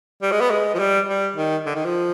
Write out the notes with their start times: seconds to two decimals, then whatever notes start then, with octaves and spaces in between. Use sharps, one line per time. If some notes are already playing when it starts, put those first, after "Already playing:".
0.22 G3
0.32 G#3
0.41 B3
0.50 G#3
0.74 F3
0.79 G3
1.08 G3
1.36 D#3
1.66 D3
1.75 D#3
1.85 F3